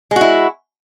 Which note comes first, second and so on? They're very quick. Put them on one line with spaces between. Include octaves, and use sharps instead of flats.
G#3 F#4 E4